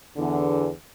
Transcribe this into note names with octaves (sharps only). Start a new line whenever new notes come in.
E2 D3